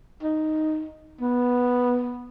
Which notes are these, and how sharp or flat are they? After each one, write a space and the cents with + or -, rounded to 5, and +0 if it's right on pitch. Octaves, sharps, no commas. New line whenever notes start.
D#4 +0
B3 -5